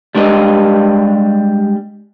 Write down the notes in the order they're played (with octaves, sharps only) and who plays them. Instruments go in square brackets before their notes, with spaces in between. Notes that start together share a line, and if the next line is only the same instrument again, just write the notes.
[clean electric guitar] G3 G#3 D4 G4 D#5